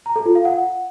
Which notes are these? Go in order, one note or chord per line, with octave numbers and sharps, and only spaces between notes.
A#5
A4
F4
F5
F#5